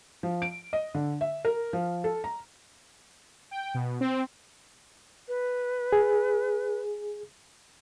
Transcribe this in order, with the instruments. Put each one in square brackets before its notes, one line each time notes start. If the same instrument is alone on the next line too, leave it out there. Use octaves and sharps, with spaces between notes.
[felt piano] F3
D7
D#5
D3
E5
A#4
F3
A4
A#5
[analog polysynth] G5
B2
C4
[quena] B4
[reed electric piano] G#4